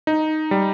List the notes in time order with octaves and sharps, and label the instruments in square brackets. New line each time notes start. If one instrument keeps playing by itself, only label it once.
[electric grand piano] D#4
G3